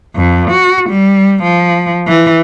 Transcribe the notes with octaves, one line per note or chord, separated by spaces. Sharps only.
F2
F#4
G3
F3
E3